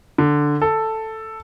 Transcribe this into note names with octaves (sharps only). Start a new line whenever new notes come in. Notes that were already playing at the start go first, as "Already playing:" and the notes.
D3
A4